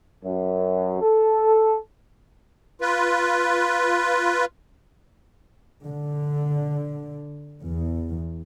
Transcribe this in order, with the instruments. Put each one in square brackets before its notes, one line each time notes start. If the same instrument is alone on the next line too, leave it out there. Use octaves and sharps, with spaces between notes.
[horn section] F#2
A4
[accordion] F4 B4
[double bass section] D3
E2